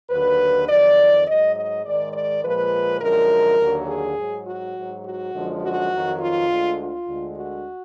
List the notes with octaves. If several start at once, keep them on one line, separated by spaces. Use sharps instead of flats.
D#2 D3 F#3 B4
F2 D#3 F#3 D5
G#2 F#3 D#5
D#5
G#2 D#3 G#3 D5
D5
A#2 F3 G#3 B4
F#2 D3 F3 G#3 A#4
D#2 D3 F#3
G#4
G#2 F#3
F#4
G#2 F#3
F#4
F#2 D3 F3 G#3
F#4
F2 D#3 F#3
F4
D2 D3 G#3
F4
D2 D3 G#3
F#4